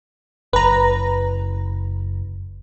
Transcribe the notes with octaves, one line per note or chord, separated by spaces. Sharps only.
F#1 B4 A#5